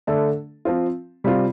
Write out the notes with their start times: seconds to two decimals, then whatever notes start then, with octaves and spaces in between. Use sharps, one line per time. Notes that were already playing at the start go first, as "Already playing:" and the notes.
0.07 D3 A3 D4 A4
0.65 F3 C4 F4
1.24 C3 G3 C4 F4